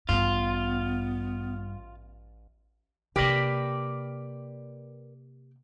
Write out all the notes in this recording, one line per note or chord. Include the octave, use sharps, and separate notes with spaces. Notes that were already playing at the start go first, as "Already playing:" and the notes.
A1 G2 B3 F4
C3 A#3 G4 A#4 B4 D5